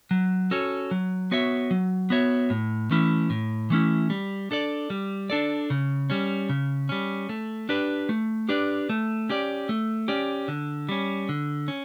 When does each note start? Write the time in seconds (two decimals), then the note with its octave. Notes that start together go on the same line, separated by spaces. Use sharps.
0.11 F#3
0.51 C#4 F#4 A4 C#5
0.91 F#3
1.31 B3 F#4 C#5 E5
1.71 F#3
2.10 B3 F#4 C#5 E5
2.50 A2
2.91 E3 A3 C#4 E4
3.30 A2
3.70 E3 A3 C#4 E4
4.10 G3
4.51 D4 A4 D5
4.90 G3
5.30 D4 A4 D5
5.70 C#3
6.10 G3 C#4
6.49 C#3
6.89 G3 C#4
7.29 A3
7.69 D4 G4 B4 D5
8.09 A3
8.49 D4 G4 B4 D5
8.90 A3
9.29 C#4 G4 D5
9.69 A3
10.08 C#4 G4 D5
10.48 D3
10.89 G3 C#4
11.29 D3
11.68 C#4